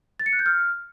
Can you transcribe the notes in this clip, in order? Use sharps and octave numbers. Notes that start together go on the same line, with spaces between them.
A6
C#7
F#6
G6
F6